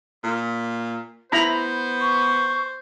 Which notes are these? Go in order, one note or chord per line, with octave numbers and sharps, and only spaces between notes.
A#2
B3 E4 C5 A#5 B5
C#6